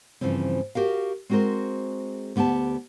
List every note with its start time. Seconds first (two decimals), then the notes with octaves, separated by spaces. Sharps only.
0.21 G2 C#3 E3 F3 C4
0.75 F#4 G4 A#4 F5
1.30 G#3 C4 F#4 G#4 A#4 C5
2.36 D2 B3 G4 G5 A5